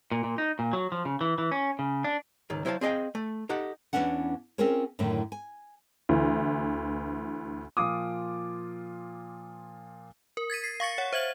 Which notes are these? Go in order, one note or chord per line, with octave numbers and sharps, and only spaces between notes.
A#2
A#2
D#4
A#2
F#3
F3
C#3
E3
E3
C#4
C#3
D4
C#2 G#2 D#3
F#3 E4 C5 D5 F5 A5
C4 G#4 D#5 F5 G5
A3
D#4 G4 A4 F#5
E2 A3 B3 C#4 D4 F#5
C4 C#4 F4 G#4 A#4 C#5
F#2 A2 D3 D#3
G#5
D2 E3
A#2 F3 F4 D6 D#6
A#4
G#6 A6 B6 D#7
C7
F5 C#6 A6 C#7
C#5 F#5
C5 E5 G#6 F#7